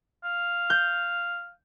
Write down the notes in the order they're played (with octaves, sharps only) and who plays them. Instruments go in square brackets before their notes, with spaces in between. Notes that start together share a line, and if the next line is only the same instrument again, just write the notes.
[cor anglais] F5
[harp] G6